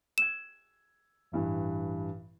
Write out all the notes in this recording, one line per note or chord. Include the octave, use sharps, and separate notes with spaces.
E6 G#6 E7
A1 G2 E3